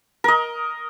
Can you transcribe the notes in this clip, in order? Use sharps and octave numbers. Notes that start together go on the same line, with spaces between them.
A#4 D#5